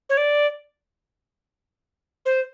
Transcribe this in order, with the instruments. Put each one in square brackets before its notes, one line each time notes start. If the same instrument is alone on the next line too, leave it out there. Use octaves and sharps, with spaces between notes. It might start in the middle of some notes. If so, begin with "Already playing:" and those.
[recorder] C#5
D5
C5